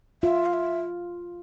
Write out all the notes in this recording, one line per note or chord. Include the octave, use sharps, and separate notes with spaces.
F4 E5
F5
E5